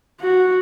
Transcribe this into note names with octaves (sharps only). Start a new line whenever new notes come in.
F#4